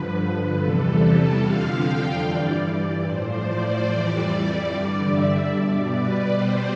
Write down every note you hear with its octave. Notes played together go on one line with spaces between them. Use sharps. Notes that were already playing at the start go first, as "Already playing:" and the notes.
Already playing: G2 D3 F3 B4
E2 C3 E3 G3 A4
F2 D3 F3 F5
G5
G2 E3 G3 D5
A2 F3 C5
D5
F2 E3 G3
G2 D3 G3 D5
E5
B2 G3 D5
B4
B2 G3 C5